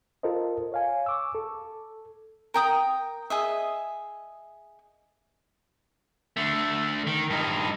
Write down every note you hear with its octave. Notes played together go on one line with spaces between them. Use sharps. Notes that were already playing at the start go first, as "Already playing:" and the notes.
F4 A4 A#4 C5 D#5
C#5 F5 G#5
C#6 D6 E6
A4
A#4 G5 D#6
G#4 D#5 E5
D3 A3
D#3
G2 D#4